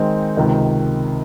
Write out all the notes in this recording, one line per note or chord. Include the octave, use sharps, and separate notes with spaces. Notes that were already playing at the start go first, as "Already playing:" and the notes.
Already playing: D#3 G#3 C4 D#4
C#2 C3 D#3